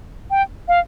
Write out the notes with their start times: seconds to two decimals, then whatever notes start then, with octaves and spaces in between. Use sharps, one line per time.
0.31 G5
0.68 F5